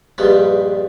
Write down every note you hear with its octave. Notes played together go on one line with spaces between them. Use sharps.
A#1 G2 G3 G#3 B3